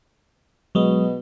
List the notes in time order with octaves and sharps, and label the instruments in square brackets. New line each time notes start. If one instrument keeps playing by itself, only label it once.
[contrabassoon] B2 [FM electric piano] F#3 G#3